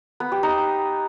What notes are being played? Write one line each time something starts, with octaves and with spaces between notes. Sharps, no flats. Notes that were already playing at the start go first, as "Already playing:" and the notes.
B3
G4
D#4